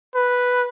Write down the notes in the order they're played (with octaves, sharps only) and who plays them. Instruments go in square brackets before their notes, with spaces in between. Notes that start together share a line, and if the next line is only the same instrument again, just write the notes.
[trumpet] B4